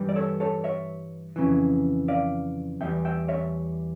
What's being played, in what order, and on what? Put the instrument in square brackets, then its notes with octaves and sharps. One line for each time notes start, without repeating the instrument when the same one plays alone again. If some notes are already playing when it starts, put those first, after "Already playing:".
Already playing: [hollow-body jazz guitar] G2 E3 G3
D5
A4 C#5
A4 C#5
C#5 E5
F2 C#3 E3
D5 F5
E2 E3 G3 E5 G5
E5 G5
C#5 E5